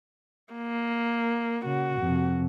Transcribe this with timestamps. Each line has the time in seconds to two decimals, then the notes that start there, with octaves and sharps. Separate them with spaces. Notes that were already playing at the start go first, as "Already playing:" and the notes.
0.54 A#3
1.65 C#3 F#4
2.00 F2 C3